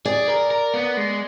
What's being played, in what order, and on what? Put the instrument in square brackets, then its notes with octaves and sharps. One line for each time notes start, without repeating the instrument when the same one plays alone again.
[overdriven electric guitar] G#4 [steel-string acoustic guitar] D5
[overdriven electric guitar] A#4
A#4
B3
G#3